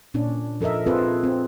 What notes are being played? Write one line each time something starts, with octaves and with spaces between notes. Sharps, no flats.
A#2 C#4 D4
F3 A4 A#4 D#5 E5
C4 F4 G#4 A4 B4
C4